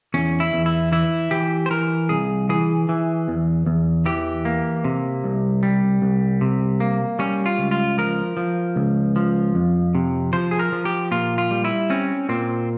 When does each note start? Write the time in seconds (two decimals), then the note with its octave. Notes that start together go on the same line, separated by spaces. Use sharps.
0.14 E2 C#4
0.40 E4
0.53 E2
0.66 E4
0.92 E3 E4
1.31 E3 G4
1.66 C5
1.70 E3 A#4
2.09 C2 G#4
2.49 E3 G#4
2.89 E3
3.28 E2
3.66 E2
4.06 E3 G4
4.45 A#3
4.84 C3
5.24 C2
5.63 G3
6.02 C2
6.41 C3
6.80 A#3
7.19 G3 C#4
7.46 F4
7.58 C#2
7.71 F4
7.98 F3 A#4
8.37 F3
8.76 C#2
9.16 F3
9.55 F2
9.95 C3
10.33 F3 C5
10.51 G#4
10.59 A#4
10.72 F3
10.85 G4
11.12 A#2 F4
11.38 F4
11.51 G3
11.65 E4
11.90 C4 C#4
12.29 A#2 C4